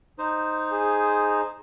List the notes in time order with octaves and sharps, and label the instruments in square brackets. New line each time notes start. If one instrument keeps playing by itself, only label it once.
[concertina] D#4 C5
[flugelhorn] G#4